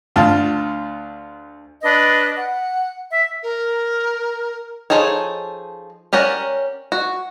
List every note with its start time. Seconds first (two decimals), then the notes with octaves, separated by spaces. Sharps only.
0.16 D2 F4 A5
1.83 D4 B4 D#5
2.37 F#5
3.10 E5
3.43 A#4
4.90 F3 D#4 G#4 A4 C#5
6.13 C#4 G4 A#4 D5 F#5
6.92 F#4